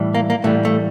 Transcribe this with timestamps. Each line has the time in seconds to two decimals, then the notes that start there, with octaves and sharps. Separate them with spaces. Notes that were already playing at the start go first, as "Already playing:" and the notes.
Already playing: A2 E3 G3
0.15 A#3
0.30 A#3
0.44 A2 E3 G3 A3
0.65 A3